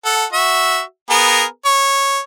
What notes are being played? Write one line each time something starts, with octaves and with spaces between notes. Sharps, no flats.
A4 F#5
F#4 E5
B3 G#4 A#4
C#5